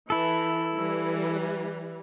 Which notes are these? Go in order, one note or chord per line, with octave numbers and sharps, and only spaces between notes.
E3 E4 A4
E3 G3